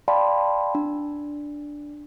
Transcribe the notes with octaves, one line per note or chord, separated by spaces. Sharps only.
D5 F5 G5 A5 B5 C6
D4